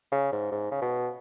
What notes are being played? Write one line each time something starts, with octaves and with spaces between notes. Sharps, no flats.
C#3
G#2
G#2
C#3
B2